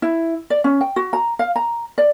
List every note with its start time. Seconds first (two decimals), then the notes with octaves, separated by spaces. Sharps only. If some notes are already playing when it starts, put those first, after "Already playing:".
0.02 E4
0.50 D5
0.64 C#4
0.81 G5
0.96 F#4
1.13 A#5
1.39 F5
1.56 A#5
1.98 D5